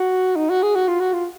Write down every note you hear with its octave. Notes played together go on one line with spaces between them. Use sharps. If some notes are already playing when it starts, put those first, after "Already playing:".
Already playing: F#4
D#4
F#4
G#4
F#4
F4
F#4
F4